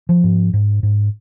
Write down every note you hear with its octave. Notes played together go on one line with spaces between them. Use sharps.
F3
G#2
G#2
G#2